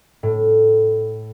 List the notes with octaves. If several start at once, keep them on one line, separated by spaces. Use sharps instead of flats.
A2